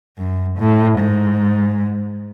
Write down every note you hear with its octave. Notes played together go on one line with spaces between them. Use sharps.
F#2
A2
G#2